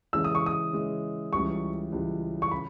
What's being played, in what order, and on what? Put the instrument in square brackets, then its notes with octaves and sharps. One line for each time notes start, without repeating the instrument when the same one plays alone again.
[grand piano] C#3 E3 G#3 C#4 [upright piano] E6
[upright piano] D#6
C#6
D#6
[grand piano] C#3 E3 G#3 C#4
[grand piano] C#2 C#3 E3 G3 [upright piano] C#6
[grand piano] C#2 C#3 E3 G3
[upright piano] C#6
[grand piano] C#3 [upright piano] B5